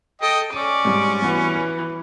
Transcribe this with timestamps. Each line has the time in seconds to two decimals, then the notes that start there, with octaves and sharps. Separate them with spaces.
0.22 A4 D#5 G5
0.53 C#4 D5 D6 D#7
0.85 G#2 G3
1.22 E3 G3 B3 F#4
1.55 B4